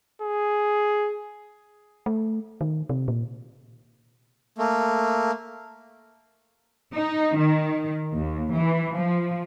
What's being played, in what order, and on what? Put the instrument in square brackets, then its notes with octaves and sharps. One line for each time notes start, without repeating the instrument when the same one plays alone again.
[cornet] G#4
[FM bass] A3
D#3
C3
A#2
[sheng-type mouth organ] A3 A#3
[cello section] D#4
D#3
D#2
E3
F3